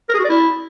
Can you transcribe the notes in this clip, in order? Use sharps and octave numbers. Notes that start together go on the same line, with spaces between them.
A#4
G#4
F#4
D5
E4